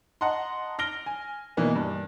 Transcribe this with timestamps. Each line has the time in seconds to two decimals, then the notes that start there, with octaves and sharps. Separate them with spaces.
0.21 D#5 F#5 A5 A#5 C6
0.79 F6 A#6 D7 G7
1.06 G#5
1.57 B2 E3 A#3 D4 D#4
1.75 G2